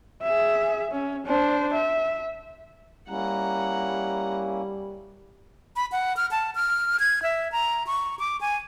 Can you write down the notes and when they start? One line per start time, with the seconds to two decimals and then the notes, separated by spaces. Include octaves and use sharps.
0.23 G#4 E5
0.91 C#4
1.26 D4 C5
1.74 E5
3.09 G3 A#3 C#4 E4 F#5 A#5
5.76 B5
5.92 F#5
6.17 F6
6.31 A5
6.55 F6
7.00 G#6
7.23 E5
7.52 A#5
7.87 C#6
8.19 D6
8.41 G#5